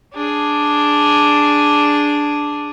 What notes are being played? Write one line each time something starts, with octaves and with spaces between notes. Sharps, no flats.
D4 G#4